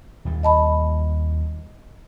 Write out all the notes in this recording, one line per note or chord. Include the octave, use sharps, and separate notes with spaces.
D#2 G3
D#5 A5 B5